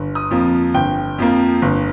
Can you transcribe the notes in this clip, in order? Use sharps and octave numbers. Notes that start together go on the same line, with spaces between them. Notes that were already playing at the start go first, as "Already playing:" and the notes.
Already playing: G1
D#6
F2 F3 A#3
G1 G5
F2 F3 A#3
G1